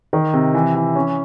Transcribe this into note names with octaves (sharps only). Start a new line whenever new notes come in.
D#3
C3
E3
E3
C#4